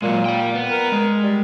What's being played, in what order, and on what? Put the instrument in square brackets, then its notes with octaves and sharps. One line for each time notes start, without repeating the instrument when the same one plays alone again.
[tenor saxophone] A#2 [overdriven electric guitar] F#3 G#3
[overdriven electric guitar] D5 G5
B3
[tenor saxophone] A#4
[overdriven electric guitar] G#3
[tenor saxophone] G3